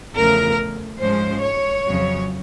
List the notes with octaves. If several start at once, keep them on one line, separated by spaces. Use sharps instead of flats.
E2 C#3 F3 A3 A#4
G#2 F3 G#3 C#4 C5
C#5
F2 C#3 F#3